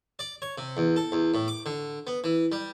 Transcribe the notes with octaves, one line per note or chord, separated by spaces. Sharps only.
D5
C#5
C3
E2
A4
E2
A2
D6
D3
B3
E3
G3